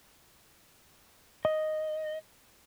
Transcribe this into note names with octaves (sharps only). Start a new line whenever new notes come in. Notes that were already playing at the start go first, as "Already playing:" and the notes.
D#5